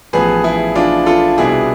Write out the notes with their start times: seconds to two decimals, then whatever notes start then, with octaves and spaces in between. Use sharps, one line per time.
0.13 A1 A2 F3 B3 G#4 B4
0.44 E4 G#4
0.75 D4 F4
1.06 F4 A4
1.38 C2 B2 B3 D4 E4 G#4